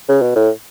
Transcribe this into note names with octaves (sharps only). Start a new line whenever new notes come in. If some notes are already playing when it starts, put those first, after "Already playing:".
C#3
B2
A2